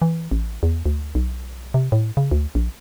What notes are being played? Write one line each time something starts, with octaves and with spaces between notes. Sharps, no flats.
E3
A1
E2
D2
B1
C3
A2
C#3
D2
A#1